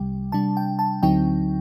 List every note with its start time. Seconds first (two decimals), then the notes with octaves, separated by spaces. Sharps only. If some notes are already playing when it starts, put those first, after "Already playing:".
Already playing: C2 C3 G3 G5
0.32 C3 G3 D4 A5
0.57 G5
0.79 A5
1.03 D2 D3 F#3 C4 D#4 G5